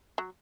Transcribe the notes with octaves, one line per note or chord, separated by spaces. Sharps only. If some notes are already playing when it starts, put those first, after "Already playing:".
F#3